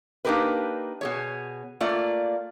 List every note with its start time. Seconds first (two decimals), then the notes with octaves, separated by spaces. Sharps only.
0.25 A#3 D4 D#4 G4 A#4 B4
1.01 B2 G#4 C#5
1.80 A3 A#3 F4 D5